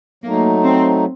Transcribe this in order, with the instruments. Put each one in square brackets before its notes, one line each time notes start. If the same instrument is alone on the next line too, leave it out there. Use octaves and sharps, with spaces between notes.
[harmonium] F#3 A3 D#4 [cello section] A#3
[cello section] C4